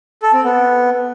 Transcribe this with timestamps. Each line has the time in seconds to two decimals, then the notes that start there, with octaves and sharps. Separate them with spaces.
0.23 A4
0.33 C4
0.44 B3